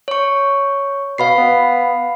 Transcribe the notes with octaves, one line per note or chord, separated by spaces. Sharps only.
C#5 C#6
B2 F5 B5 C7
B3